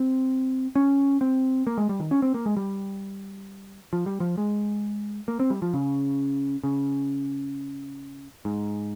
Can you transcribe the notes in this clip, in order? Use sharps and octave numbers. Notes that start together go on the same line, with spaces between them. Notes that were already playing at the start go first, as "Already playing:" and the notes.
Already playing: C4
C#4
C4
A#3
G#3
G3
D#3
C#4
C4
A#3
G#3
G3
F3
G3
F3
G#3
A#3
C4
G3
F3
C#3
C#3
G#2